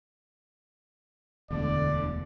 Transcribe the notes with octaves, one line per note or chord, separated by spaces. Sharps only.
E1 D2 D3 D5